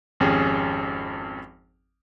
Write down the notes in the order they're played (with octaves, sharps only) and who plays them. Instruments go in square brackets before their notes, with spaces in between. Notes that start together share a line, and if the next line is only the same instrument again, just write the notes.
[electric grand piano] G#1 F2 C#4 G4 G#4